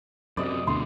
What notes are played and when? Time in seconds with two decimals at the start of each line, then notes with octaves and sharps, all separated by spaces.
0.37 F#2 C3 D5 D#5
0.67 D2 B2 D3 C6